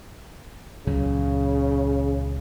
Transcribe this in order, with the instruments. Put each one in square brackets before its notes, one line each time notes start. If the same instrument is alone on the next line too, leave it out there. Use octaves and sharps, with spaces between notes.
[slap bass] C#2 A#2 F#3 [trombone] C#3